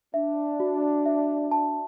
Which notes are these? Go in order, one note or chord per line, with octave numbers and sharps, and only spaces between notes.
D4 E5
F#4
E5
A5